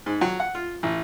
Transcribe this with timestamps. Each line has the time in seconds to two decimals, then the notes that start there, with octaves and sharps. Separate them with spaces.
0.06 G#2
0.21 F#3
0.40 F#5
0.55 F4
0.83 A1